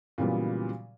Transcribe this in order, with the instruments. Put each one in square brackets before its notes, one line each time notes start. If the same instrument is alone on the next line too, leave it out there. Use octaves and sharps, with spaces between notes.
[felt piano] A#2 C#3 E3 F#3 G3 B3